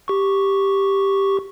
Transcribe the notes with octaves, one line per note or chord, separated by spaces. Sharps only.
G4 C#6